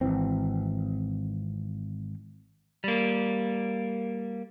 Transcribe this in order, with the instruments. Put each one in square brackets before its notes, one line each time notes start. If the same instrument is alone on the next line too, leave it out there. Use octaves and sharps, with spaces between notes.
[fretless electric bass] G#1 D#2 E3 C4
[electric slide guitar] G3 A#3